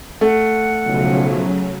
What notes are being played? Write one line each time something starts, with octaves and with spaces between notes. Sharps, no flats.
A3 F#5
B1 A2 C#3 F3 F#3